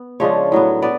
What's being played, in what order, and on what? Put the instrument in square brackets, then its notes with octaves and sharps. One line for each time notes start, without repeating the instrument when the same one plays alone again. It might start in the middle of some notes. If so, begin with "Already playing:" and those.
Already playing: [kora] B3
C#3 F3 G#3 D4 C#5
A2 F#3 B3
B3 D5